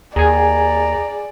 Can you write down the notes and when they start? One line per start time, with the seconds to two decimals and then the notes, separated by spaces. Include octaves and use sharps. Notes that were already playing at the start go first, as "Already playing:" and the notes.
0.16 D#2 G#4 D5 G#5 A#5